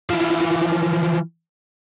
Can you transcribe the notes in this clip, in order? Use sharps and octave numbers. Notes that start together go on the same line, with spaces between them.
E3 F3